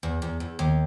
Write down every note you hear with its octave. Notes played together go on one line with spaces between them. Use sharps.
E2
E2
E2
D#2